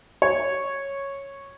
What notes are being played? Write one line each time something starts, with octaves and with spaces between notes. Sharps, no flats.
C#5